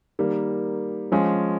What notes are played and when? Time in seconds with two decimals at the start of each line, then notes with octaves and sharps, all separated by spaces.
0.19 D#3 G3 A#3
1.12 F3 G#3 C#4 F4